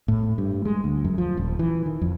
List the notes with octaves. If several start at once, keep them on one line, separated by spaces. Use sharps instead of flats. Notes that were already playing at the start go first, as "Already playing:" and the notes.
A2
G2
G#3
D2
F#2
F3
D#1
E3
D#3
F2